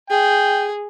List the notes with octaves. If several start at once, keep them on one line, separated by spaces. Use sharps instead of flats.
G#4 G5